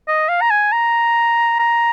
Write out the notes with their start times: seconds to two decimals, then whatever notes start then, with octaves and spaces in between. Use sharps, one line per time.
0.08 D#5
0.29 F5
0.41 A#5
0.51 G#5
0.72 A#5
1.60 A#5